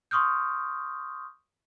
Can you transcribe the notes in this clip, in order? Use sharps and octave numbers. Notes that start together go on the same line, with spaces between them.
C6 C#6 D#6 F6 G6